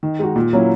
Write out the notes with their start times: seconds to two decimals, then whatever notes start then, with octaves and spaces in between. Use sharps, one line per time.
0.03 D#3
0.19 G#3 D#4 F#4
0.36 A#2
0.53 F#3 A#3 C#4 E4